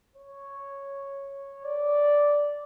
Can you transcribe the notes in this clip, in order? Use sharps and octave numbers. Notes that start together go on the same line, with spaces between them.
C#5
D5